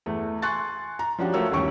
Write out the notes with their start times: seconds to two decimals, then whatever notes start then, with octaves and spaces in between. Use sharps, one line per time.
0.06 E2 A3
0.42 G#5 C6 C#6 F#6 A6
0.99 A#5
1.19 F3 C#4 D4 F#4 G4
1.34 F3 A3 F#4 A#4 C#5 E6
1.51 A1 D#2 G3 C#4 C#6 D7